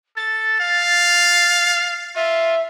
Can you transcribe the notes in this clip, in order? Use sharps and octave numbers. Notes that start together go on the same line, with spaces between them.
A4 A6
F5
F4 E5